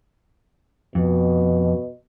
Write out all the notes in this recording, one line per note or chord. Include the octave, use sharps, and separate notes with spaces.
F2 B2